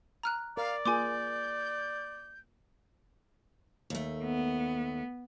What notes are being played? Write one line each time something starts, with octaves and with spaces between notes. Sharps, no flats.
A#5 F6 F#6
A#4 D5 F5
A#3 F4 G#4 G#5 C6 D6 G6
D#2 A3
B3